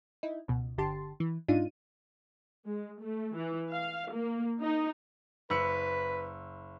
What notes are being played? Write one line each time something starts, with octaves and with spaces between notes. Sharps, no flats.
D#4 E4
C#2 B2
G1 D3 G4 A5 C6
E3
G#2 D4 D#4 F4 D#7
G#3
A3
E3
F5
A#3
D#4
F#1 B4 E6 C#7